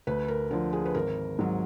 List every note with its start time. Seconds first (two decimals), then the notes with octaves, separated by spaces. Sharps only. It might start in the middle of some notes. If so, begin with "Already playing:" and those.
0.07 D2 B4
0.28 A#4
0.51 D3 F3 A#4
0.73 G#4
0.86 B4
0.95 G#1 A#4
1.39 G#2 F#3